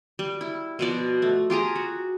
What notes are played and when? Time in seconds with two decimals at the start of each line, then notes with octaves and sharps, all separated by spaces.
0.19 G3
0.41 E4
0.79 B2 F3 D5
1.22 A3
1.50 F4 G4 G#4 A#5
1.76 F#4